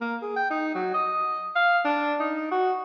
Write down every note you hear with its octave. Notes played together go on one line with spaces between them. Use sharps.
A#3
G#4
G5
D#4
F#3
D#5
F5
D4
D#4
F#4